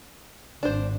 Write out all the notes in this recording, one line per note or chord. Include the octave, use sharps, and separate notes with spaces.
G#1 D4 C5